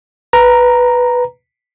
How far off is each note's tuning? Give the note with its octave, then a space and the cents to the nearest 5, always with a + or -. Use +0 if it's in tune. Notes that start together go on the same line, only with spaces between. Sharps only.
B4 +0 A#5 +0